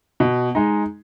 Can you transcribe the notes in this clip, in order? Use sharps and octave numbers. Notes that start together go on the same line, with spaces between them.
B2
G#3 D#4